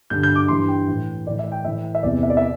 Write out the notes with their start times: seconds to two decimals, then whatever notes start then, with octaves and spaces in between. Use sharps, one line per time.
0.10 G2 D3 G6
0.23 G6
0.36 D6
0.48 G2 E3 C6
0.68 G5
0.88 A2 E3
1.27 A2 E3 D5
1.39 E5
1.52 G5
1.65 A2 E3 E5
1.95 E5
2.03 E2 C3 E3 D5
2.23 E5
2.30 D5
2.37 E5